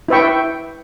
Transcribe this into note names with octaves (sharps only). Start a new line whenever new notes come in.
E4 B4 E5 G5 C#6